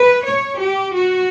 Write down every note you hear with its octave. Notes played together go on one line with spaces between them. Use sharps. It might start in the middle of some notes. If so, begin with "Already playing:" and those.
Already playing: B4
C#5
G4
F#4